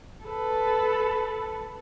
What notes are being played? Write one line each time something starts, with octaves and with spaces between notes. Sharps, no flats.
A4 B4